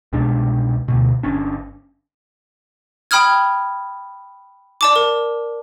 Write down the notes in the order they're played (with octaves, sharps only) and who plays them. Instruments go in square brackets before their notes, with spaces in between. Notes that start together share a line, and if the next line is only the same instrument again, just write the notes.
[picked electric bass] C2 B2 G#3 D4
D2 B2
G1 C#4 D4
[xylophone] G5 B5 D#6 F6 G#6
D5 A5 D6
A#4